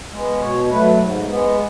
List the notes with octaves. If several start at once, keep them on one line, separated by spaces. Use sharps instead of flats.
G#3 B3
B2 C#5
F#3 A3 B4
G#2
G#3 B3